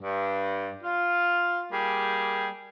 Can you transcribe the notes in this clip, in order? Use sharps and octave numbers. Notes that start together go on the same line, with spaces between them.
G2
F4
G3 A#3 G4 G#4